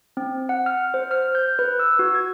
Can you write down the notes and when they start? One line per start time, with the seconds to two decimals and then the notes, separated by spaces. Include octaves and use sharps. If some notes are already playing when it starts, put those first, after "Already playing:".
0.17 C4
0.49 F#5
0.66 F6
0.94 C5
1.11 F6
1.35 G6
1.59 B4
1.79 E6
1.99 F#4
2.15 G#6